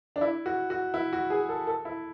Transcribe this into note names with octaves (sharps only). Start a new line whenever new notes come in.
D4
E4
F#4
F#4
E4
F#4
G#4
A4
A4
E4